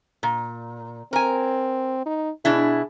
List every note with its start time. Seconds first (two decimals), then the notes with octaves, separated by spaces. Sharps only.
0.23 A#2
1.13 C4 A#4 G#5
2.06 D#4
2.45 B2 D4 E4 G#4